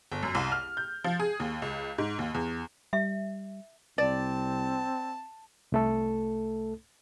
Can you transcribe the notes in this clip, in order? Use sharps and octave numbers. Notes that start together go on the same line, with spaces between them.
G1
F#2
C2
F6
G6
F3
G#4
D#2
C#2
G#2
D#2
E2
G3 E5
C2 C4 D5 A5
C2 A3 A4